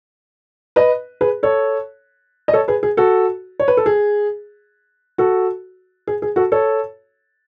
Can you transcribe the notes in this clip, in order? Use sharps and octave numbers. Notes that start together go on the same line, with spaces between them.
B4 D#5
G#4 B4
A4 C#5
D#5
A4 C#5
G#4 B4
G#4
F#4 A4
C#5
B4
A4
G#4
F#4 A4
G#4
G#4
F#4 A4
A4 C#5